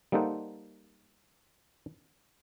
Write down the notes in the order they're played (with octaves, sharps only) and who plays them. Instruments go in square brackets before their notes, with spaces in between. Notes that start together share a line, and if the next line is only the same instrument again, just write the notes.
[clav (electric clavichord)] G3 A#3 D#4 A4 C5 F#5